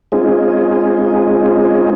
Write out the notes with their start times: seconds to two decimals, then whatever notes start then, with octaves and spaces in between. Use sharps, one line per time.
0.12 G#3 C4 C#4 D#4 F4 G#4